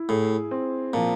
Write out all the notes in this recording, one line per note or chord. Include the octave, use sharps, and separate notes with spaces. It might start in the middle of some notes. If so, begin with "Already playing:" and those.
Already playing: E4
A2 G#4
C4
A#2 F3